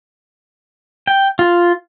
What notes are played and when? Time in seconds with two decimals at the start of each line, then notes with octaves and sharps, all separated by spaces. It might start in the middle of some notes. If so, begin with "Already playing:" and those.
1.07 G5
1.39 F4